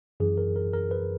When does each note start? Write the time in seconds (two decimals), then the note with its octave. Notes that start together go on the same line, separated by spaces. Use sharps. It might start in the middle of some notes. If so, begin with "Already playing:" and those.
0.20 F#2 E3 G#4
0.38 A#4
0.56 A#4
0.73 A#4
0.91 B4